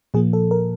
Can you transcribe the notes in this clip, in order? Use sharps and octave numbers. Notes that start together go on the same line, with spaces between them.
A#2 F3 A#3 G#4
A4
A#4